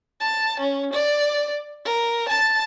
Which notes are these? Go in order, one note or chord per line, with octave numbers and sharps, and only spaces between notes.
A5
C#4
D5
A#4
A5 A6